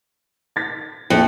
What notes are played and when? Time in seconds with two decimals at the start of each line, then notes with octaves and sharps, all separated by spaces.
0.56 G#6 A6 B6
1.10 A#1 F2